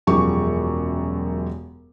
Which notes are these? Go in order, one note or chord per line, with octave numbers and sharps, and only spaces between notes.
E1 F#2 F3 G4 G#4 C#6